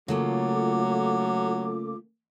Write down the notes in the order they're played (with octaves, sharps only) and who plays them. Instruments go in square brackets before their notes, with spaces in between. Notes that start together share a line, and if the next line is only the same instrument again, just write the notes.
[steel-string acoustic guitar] C#3 A3 A#3 [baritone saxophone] F#3 [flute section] F4 A4 D6